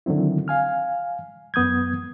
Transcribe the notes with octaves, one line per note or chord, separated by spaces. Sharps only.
D3 D#3 F#3 C4 E4
F5 G#5 F6
F#2 B3 D#6 G6 G#6